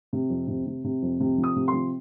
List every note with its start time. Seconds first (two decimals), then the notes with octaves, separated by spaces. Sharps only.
0.13 C3
0.30 F2
0.48 C3
0.66 C3
0.84 C3
1.02 F2
1.20 C3
1.38 F3
1.44 D#6
1.56 C3
1.68 C6
1.73 F3